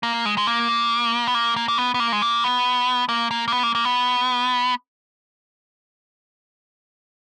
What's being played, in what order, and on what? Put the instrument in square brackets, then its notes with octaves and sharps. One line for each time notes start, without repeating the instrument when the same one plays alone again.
[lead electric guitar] A#3
G#3
G#3
A#3
B3
A#3
A#3
A#3
B3
B3
A#3
G#3
A#3
B3
A#3
A#3
A#3
B3
A#3
A#3
B3